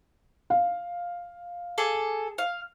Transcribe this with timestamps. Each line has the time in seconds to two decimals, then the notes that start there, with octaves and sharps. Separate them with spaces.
0.50 F5
1.78 G#4 A4 D6
2.38 F5